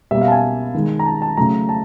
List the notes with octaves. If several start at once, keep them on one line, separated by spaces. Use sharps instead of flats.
B2 G3 A#3 E5
F5
A5
G#5
D#3 G#3
A#5
A5
A5
C#3 F#3 A3 A#5
A5